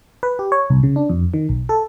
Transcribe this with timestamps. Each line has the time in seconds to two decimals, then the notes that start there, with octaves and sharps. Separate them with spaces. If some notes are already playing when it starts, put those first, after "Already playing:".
0.23 B4
0.39 G4
0.52 C#5
0.70 C2
0.83 C#3
0.96 D4
1.09 F2
1.34 D#3
1.49 B1
1.69 A4